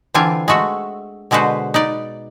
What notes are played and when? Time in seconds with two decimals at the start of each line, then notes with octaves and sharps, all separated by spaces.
0.14 D3 E3 C4 D4 F4 G#5
0.48 G#3 A3 F#4 E5
1.31 B2 D3 G#3 F#4 B4 C5
1.74 D#4 B4 D5